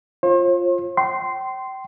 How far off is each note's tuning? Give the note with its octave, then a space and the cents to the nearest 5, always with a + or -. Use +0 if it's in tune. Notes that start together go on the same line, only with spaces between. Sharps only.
F4 +0 C5 +45
G5 -30 C6 -10